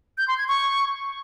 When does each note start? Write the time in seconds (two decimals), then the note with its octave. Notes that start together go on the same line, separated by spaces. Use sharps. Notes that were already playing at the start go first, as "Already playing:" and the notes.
0.18 G6
0.28 C6
0.38 G#6
0.48 C#6